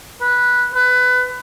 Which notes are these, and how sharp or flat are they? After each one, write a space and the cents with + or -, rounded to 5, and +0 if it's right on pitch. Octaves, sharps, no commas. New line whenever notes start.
B4 -10
B4 +20